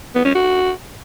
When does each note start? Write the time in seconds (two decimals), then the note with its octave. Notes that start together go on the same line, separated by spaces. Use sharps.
0.15 B3
0.25 C#4
0.35 F#4